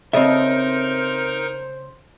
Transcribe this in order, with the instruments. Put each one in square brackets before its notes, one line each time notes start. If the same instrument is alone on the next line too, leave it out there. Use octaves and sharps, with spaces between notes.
[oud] C#3 A4 D#5 [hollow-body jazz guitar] C4 E5 [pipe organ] D#4 A#4 [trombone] C5